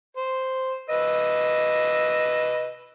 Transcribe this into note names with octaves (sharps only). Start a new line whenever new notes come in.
C5
B4 D#5 E6